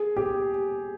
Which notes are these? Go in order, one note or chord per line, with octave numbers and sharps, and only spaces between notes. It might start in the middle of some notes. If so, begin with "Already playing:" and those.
Already playing: G#4
G4